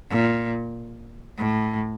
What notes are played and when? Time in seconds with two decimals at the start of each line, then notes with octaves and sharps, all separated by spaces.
0.10 A#2
1.38 A2